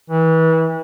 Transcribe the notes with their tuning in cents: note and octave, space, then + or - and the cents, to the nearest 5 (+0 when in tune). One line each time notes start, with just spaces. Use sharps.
E3 -30